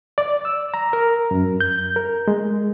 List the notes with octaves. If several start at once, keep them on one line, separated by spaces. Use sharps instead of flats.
D5
E6
A#5
A#4
F#2
G6
A#4
G#3